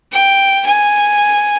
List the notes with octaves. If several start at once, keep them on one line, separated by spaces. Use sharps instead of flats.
G5
G#5